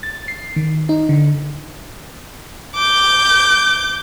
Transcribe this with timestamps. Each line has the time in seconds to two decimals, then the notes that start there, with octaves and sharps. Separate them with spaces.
0.03 A6
0.28 C7
0.56 D#3
0.89 D#4
1.09 D3
2.75 D6 G6